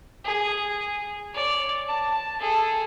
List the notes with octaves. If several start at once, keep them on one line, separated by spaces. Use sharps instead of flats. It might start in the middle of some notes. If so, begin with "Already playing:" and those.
G#4
C#5 D5
A5
G#4 A4